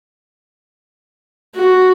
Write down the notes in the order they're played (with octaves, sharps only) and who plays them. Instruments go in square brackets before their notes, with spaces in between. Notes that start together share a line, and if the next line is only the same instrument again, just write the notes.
[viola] F#4